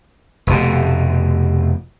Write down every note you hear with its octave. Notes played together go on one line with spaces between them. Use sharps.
F1 B2